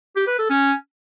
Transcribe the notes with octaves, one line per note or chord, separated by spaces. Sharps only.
G4
B4
A4
C#4